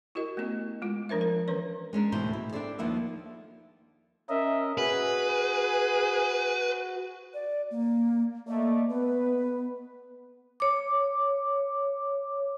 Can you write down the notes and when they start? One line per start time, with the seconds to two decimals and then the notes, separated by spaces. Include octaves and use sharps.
0.15 E4 F#4 G4 A#4 D#5
0.37 A3 B3 C#4 G4 D#5
0.82 G#3 F4
1.09 F3 D4 A#4 C5 E5
1.21 A#4
1.48 E3 C#4 A#4 B4 C#5
1.93 G#3 C#4 D4 A#4
2.12 D2 B2 E3 C5
2.33 E4
2.53 D4 E4 G4 A4 C5 D5
2.79 D#2 F3 A#3 B3 E5
4.29 C#4 A#4 D#5 E5
4.78 F#4 G#4 B4
7.34 D5
7.71 A#3
8.47 A3 A#3 D5 D#5
8.89 B3 B4
10.60 C#5 D6